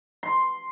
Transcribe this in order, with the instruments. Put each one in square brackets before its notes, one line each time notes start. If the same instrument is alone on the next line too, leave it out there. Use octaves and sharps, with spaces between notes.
[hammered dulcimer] C6